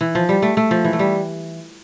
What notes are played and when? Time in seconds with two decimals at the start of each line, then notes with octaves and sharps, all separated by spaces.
0.01 E3
0.15 F3
0.29 G3
0.42 A3
0.57 A3
0.71 F3
0.84 E3
0.93 A3
0.99 G3